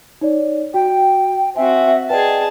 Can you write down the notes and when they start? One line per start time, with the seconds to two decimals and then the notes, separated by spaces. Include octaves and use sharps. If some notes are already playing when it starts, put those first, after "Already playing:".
0.21 D#4 C#5 D5
0.74 F#4 G5
1.56 C4 F#4 E5 G5 G#5
2.10 G#4 B4 D5 D#5 G5 A5